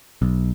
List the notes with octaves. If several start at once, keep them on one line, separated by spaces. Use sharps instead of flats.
B1